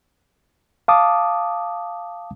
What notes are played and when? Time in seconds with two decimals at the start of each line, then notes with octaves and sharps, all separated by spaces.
0.88 F5 A5 D6 D#6